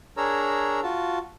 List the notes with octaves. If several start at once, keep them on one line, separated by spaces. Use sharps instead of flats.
D4 G#4 A#4 C#5 A#5 E6
F4 F#4 A5